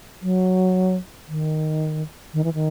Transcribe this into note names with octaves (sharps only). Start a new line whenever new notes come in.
F#3
D#3
D#3
E3
D#3